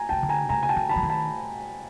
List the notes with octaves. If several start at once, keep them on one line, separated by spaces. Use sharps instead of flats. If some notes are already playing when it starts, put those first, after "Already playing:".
Already playing: G#5 A#5
G5 A5
C#3
D3
G#5 A#5
C#3 G#5 A#5
G#5
G5 A5
D3
A5 B5
E3
D#3
A5 B5